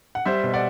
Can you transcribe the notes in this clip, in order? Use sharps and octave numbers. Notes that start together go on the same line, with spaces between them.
F#5
G3 C5 E5
B2
D5 F#5